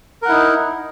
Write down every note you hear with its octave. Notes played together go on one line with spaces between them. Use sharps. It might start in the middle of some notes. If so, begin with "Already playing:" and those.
D#4 E4 A#4 F#5